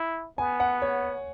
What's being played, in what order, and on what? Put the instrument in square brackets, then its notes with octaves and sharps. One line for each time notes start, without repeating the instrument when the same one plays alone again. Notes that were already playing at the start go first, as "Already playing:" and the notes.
Already playing: [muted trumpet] E4
[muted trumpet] B3 [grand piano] G#5
[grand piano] F#5
C#5